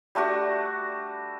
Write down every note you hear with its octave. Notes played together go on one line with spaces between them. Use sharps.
G3 A3 D4 F#4